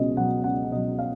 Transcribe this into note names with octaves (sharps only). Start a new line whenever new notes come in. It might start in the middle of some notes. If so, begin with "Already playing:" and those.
Already playing: C#2 B2 F#3 D#5
B2 F#3 F#5
C#2 F#5
B2 F#3 D#5
F5